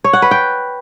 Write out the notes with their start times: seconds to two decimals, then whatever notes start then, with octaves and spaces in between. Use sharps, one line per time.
0.04 C#5
0.13 F#5
0.22 B4
0.31 G5